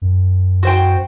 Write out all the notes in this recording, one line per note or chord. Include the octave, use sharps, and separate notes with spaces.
F#2
F#4 C5 G5